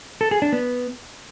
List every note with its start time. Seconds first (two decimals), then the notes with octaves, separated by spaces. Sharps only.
0.21 A4
0.31 G#4
0.42 D4
0.53 B3